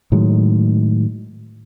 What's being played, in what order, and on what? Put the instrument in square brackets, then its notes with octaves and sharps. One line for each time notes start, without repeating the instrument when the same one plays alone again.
[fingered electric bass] A2 D#3 F#3 G#3